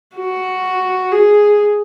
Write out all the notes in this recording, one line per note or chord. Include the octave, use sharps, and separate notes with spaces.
F#4
G#4